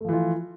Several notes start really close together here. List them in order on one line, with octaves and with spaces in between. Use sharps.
A3 F3 E3 F4